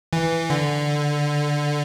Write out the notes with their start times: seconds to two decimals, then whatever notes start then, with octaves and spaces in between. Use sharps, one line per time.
0.13 E3
0.50 D3